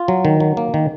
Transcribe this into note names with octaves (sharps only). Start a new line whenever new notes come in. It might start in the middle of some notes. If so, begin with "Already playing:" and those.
Already playing: F4
F#3
D#3
F#3
A#3
D#3